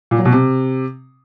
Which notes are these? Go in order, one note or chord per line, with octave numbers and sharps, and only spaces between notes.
A#2
F#3
B2
C3